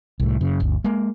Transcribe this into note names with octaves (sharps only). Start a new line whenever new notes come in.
C2 A2
F#2 C#3
G1 D2
G#3 A#3